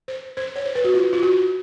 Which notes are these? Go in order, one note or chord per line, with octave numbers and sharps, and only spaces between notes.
C5
C5
C#5
C5
B4
F#4
F4
F4
F#4